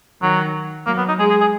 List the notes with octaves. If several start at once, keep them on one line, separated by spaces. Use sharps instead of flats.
D#3 F#3
F#3 A#3
B3
D#4
G#3 G#4
G#4
G#4